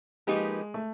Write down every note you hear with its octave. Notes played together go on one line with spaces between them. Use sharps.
F3 G#3 A#3 D#4 G4 B4
A3